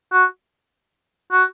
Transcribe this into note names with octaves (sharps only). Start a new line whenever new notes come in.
F#4
F#4